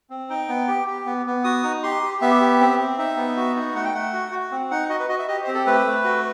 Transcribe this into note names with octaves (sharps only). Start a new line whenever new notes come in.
C4
D#4 G5
B3
G4
G4
B3
B3
F#4 D#6
D#4
G4 C6
G4
B3 E5
G4
C4
C4
D#4 E5
B3
F#4
D#4
A3 F#5
G5
A3 F#5
F#4
F#4
C4
D#4 F#5
F#4 D#5
B4
F#4 D#5
E5
G4 D#5
C5
C4
A4
A3 B4
A3
F#4